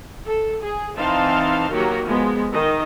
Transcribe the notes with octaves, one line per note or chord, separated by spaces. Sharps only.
A4
G#4
E3 C4 D#4 F5 A5 C6
D#3 F#3 A#3 F#4 G4 A#4
F3 G#3 B3
D#3 D#5